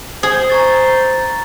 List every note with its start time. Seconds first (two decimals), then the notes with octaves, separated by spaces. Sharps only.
0.23 G#4 C5
0.50 A#5 C#6 A6